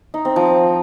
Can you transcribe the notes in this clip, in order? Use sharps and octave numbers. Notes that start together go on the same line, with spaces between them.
D#4
C4
F3